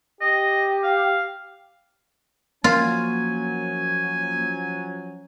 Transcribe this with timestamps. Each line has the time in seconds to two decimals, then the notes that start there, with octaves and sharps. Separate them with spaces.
0.21 G4 D#5
0.83 F5
2.64 F3 F#3 A#3 C#4 F4 G#5